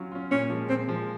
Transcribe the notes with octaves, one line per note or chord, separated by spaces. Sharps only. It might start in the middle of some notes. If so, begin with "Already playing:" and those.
Already playing: F#3 C#4 F4
C#4 F4
A#2 C#4
F3 G#3
A#2 C4
F3 G#3